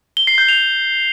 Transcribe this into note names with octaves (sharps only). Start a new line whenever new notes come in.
G7
C7
G6
F7